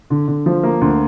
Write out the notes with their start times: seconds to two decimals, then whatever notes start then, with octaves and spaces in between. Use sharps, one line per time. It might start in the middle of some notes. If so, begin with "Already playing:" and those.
0.10 D3
0.28 D3
0.46 F3
0.63 A#3
0.81 D2